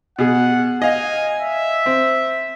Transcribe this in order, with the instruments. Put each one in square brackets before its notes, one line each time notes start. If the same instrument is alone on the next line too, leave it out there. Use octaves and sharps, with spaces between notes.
[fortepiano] B2 G#4 [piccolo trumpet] F#5
[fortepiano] D#5 F5 [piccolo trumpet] G#5
[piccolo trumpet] E5
[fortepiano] C4